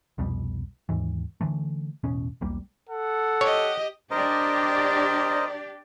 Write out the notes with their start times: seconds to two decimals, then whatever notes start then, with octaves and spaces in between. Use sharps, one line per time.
0.18 C2 F2 B2 G3
0.89 D#2 G#2 E3
1.41 D3 E3 A3
2.04 E1 A1 B2 C#4
2.41 E1 B1 G3 A#3
2.89 A4 F#5
3.41 G4 C#5 D#5
4.11 D4 G4 A#4 C5 D5 D#5